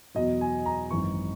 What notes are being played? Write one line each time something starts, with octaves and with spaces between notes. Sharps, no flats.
E2 B2 F#3 D#5
G#5
A#5
G#1 F#2 E3 C#6